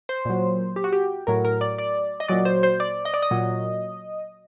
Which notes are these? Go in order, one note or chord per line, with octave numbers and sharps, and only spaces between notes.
C5
A#2 F#3
G4
F#4
G4
A2 F#3 A#4
A#4
D5
D5
D#5
A#2 F#3 D5
C5
C5
D5
D#5
D5
D#5
A#2 F#3